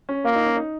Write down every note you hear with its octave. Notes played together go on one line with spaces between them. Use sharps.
C#4
A#3 F4
D#4
C#4
D#4